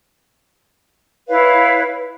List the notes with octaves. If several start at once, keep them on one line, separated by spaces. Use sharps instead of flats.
E4 B4 C#5 F5